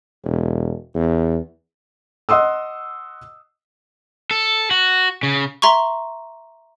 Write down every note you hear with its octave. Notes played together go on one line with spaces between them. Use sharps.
E1
E2
D#5 F#5 C6 D#6 E6
A4
F#4
C#3
E5 A#5 C6 C#6